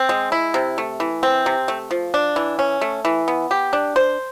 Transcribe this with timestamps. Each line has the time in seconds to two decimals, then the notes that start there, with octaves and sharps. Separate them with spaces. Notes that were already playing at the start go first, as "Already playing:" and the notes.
Already playing: C4
0.09 G#3
0.32 E4
0.54 C3
0.78 A3
1.00 E3
1.23 C4
1.46 C3
1.68 A3
1.91 F3
2.14 D4
2.36 E3
2.59 C#4
2.81 A3
3.05 E3
3.28 B3
3.51 G4
3.73 D4
3.96 C5